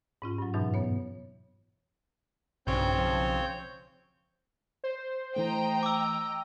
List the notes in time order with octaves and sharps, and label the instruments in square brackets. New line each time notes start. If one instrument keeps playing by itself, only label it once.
[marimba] G#2 C#4 F4
G2 F#3
F2 G#2 B2 E3 F#3 D#4
B3 C#5
[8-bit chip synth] B1 C#3 [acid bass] G2 [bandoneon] C4 C#5 G6
[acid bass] F3
[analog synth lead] C5
[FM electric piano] E3 A3 [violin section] D#5 G5 A#5
[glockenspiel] D6 E6